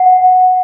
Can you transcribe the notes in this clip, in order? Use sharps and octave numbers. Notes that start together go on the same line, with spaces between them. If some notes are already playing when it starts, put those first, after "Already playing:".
Already playing: F#5